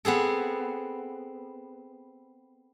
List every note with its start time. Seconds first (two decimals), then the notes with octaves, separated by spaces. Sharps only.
0.05 B3 C4 G#4 A4